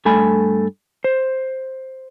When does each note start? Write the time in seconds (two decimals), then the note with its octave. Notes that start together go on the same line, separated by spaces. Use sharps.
0.05 G2 A3 A4 G#5 B5
1.04 C5